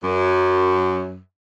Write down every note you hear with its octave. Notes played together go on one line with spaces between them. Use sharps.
F#2